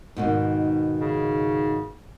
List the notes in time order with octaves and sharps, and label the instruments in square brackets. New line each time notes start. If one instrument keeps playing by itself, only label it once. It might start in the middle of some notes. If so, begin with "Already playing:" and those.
[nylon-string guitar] G#2 B2 D#3
[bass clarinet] C#3